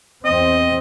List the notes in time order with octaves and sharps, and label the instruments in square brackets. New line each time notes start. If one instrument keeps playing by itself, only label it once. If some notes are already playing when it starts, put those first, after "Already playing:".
[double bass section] E2 C4 [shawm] D#5